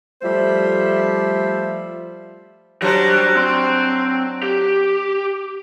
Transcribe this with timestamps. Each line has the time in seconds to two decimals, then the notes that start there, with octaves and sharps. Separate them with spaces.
0.22 F3 G3 A3 C5 E5
2.82 F#3 G3 D4 G4 C5
3.36 C4 C6
4.43 G4